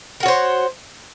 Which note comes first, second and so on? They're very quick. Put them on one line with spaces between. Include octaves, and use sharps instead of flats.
A#4 F#4 C#5 C5